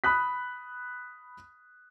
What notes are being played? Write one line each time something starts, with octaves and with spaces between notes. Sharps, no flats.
B5 D#6 F#6 B6